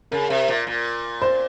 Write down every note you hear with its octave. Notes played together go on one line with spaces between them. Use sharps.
C#3 A#4
C3
A#2
A#2
C5